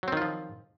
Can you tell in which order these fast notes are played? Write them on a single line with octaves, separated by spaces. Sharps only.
F#3 C4 D#3 F4 F3